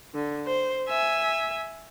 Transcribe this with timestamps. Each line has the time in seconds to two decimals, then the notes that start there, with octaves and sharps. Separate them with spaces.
0.14 D3
0.46 C5
0.88 E5 G#5